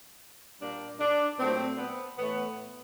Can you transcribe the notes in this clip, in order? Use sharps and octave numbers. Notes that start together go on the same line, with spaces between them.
A#2 G3 A#3 D4
D4
A#2 F#3 A3 C4
B3
A2 E3 A3 B3